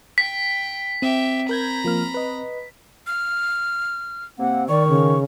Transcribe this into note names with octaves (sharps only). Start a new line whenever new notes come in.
G5 B6
C4 G4 E5
A#4 A#5 B5 G6 G#6
F3 A#3 F6
B4 D#5
F6
C3 A#3 C4 F#5
D#3 D5 C#6
C#3